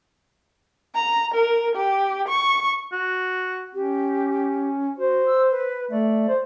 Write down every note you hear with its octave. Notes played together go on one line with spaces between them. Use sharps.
A#5
A#4
G4
C#6
F#4
C#4 G4
F#4 C5
E6
B4
A3 D5
C5